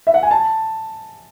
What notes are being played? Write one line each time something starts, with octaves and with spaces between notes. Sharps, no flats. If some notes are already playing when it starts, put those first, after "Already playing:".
E5
F#5
G#5
A5